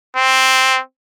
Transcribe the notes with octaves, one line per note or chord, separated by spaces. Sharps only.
C4